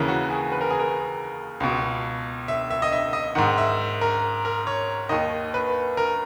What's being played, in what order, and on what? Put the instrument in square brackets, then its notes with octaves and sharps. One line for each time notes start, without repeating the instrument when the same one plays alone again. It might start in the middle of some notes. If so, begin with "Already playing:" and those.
Already playing: [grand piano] D#2 C#3 E3 A#4
F#4
G#4
B4
A#4
G#4
A#4
C#2 B2
E5
E5
D#5
E5
D#5
G#2 D#3 F#5
E5
A#4
A#4
C#5
D#2 D#3 D#5
B4
A#4